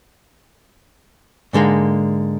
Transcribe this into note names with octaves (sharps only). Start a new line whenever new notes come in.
G#2 D3 G#3 A#3